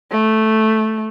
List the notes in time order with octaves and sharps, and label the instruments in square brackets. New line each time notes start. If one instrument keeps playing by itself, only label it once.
[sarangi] A3